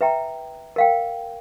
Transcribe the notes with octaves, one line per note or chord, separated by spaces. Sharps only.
B4 E5 G5 A#5
A#4 F5 G5